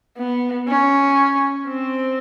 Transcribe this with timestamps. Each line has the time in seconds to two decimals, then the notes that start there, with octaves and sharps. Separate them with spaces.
0.18 B3
0.68 C#4
1.68 C4